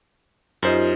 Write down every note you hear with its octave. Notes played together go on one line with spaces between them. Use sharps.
F#2 D#4 F4 G4 C5 D#5